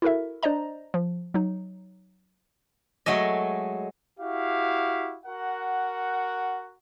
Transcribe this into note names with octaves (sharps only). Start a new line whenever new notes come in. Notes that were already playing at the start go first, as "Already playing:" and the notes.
E4 F#4 A4 A#4 E5
D4 C5 D5 D#5 A#5
F3
F#3 D#4
F#3 G#3 A3 D#5
E4 F#4 G4 F5
F#4 A#4 F#5